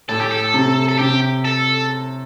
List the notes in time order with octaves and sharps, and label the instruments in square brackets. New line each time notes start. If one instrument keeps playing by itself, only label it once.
[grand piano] A2 [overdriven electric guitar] A4
[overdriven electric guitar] G4
A4
[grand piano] C3
[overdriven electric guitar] A4
[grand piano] C3 [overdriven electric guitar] G4
[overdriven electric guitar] A4